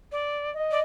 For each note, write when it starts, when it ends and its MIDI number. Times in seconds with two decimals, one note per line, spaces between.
0.12 0.51 74
0.54 0.82 75
0.71 0.79 74